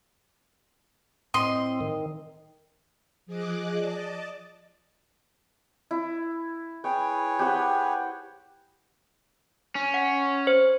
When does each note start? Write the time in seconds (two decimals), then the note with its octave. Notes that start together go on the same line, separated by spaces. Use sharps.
1.34 A2 C4 D#5 C6
1.81 D#3
3.26 F3 G#4 D#5 D6 F#6
3.76 D5 D#5 A5
5.91 E4
6.84 G#4 B4 C#5 G5
7.39 G4 C5 F#5
9.75 C#4
9.94 F#5
10.47 C5